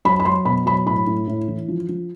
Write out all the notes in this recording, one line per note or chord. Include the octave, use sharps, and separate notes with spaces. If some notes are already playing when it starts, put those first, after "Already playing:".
F#3 B5
B5
F#3 C6
B2 B5
F#3 B5
A2 B5
A2
A2
E3
F3
F3